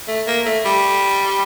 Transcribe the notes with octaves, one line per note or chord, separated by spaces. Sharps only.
A3
A#3
A3
G3